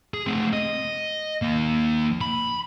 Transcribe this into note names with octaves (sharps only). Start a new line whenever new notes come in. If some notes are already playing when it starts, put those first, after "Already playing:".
G#4
A3 C4
D#5
D#2 A#3
B5